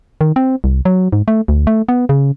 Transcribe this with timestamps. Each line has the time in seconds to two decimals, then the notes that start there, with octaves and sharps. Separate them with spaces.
0.21 D#3
0.36 C4
0.64 C2
0.85 F#3
1.13 G#2
1.28 A3
1.48 D2
1.67 A3
1.89 B3
2.09 C#3